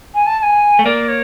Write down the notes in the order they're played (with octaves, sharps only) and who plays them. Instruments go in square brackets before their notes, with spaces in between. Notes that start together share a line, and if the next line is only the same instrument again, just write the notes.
[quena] G#5
A5
A5
G#5
[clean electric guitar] A3
[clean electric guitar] A#3 [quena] D5
[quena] C#5